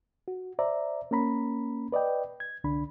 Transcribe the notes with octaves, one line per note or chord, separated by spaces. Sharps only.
F#4
C5 D5 E5 A#5
A#3 C#4 A#5 B5
B4 D5 D#5 G5
G#6
C2 D3 D4 B5